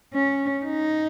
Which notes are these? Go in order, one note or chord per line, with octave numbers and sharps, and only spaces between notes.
C#4
D#4